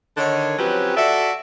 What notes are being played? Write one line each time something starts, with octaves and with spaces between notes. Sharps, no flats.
D3 D#3 C#5
F3 F#3 C4 C#4 G4 B4
F#4 A4 D5 E5